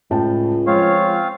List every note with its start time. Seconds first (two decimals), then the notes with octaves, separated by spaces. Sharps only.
0.11 C#2 A2 G5 A5
0.67 F3 G#3 C4 F4 C#5 F5